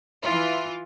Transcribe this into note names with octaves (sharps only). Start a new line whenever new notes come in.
E3 F4